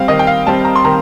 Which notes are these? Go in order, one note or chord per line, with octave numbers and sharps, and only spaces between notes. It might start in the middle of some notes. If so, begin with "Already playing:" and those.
Already playing: G3 C4 F5
D#3 D#5
G5
F5
G3 C4 A5
A#5
C6
D#3 A#5